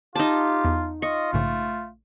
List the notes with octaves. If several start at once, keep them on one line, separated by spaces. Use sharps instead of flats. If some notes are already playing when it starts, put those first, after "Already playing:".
D#4 F4 G4 G5 A5
E2
F4 D#5 C#6
A#1 G#2 C#3 A3